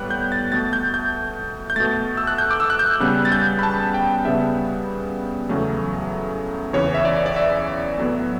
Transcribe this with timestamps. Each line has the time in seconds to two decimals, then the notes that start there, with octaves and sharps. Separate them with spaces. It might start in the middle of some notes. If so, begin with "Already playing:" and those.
Already playing: A2 G3 B3 F#6
0.10 G6
0.32 A6
0.52 B2 A3 A6
0.73 G6
0.94 G6
1.70 G6
1.76 B2 A3 A6
2.17 E6
2.27 F#6
2.38 G6
2.51 D6
2.60 E6
2.70 F#6
2.79 G6
3.00 C#3 G3 B3 F#6
3.25 A6
3.32 G6
3.59 B5
3.63 A5
3.94 G5
4.25 C#3 G3 B3 E5
5.49 E2 C#3 F#3 A3
6.73 E2 C#3 E3 C#5
6.94 E5
7.05 D5
7.26 D5
7.36 E5
7.98 A2 F#3 B3